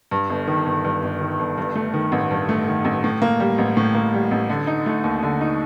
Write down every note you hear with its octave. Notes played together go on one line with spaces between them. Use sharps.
G2
G1
D#3
G1
G2
G1
D#3
G1
G2
A3
D#3
A1
G2
A3
D#3
A1
A2
A#3
G3
A1
A2
A#3
G3
A1
D3
D#4
A3
D#2
D3
D#4